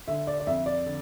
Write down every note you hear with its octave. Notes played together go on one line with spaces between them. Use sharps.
D3 E5
D5
D5
F2 E5
D5
D3